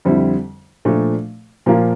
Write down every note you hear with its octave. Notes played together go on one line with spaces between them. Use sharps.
F2 D3 G3 C4 E4
A#2 F3 A3 D4
A#2 F3 A#3 F4